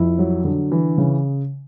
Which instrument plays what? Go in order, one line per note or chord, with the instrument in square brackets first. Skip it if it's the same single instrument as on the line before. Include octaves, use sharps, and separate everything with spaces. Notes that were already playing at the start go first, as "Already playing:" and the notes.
Already playing: [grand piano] F2 E4
F#3
D3
E3
C#3